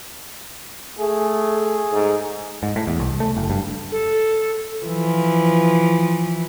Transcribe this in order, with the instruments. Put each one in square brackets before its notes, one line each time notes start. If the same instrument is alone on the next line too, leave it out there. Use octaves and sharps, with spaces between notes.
[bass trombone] A3 [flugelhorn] G#4
[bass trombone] G#2
[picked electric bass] G#2
A2
E2
C2
A3
F#1
G2
[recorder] A4
[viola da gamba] E3 F3